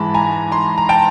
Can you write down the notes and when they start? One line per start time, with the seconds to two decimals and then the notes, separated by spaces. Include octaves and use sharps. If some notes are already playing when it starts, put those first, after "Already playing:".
Already playing: G#2 E3 G#3 A5 B5
0.14 G#5 A#5
0.52 A#5 C6
0.78 A#5
0.89 G5 A5